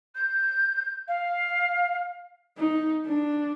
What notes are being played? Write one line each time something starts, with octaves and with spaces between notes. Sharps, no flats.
G6
F5
D#4
D4